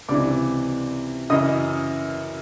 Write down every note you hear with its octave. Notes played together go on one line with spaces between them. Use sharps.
C#2 C3 E3 D5 D6
F#2 C#3 E3 D#5 D#6